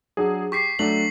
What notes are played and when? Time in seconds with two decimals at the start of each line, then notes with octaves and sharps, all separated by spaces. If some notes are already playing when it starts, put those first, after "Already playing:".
0.17 F#3 D4 G#4
0.52 G4 C#6 B6 C7
0.79 F#3 A3 D4 F#7